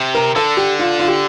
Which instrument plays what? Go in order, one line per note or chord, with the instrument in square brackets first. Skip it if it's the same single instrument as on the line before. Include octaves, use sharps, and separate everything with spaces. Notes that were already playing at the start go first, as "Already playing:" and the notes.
Already playing: [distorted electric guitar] C3
[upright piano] A#4
[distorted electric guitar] D3 [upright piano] A4
[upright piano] G4
F4
F4
G4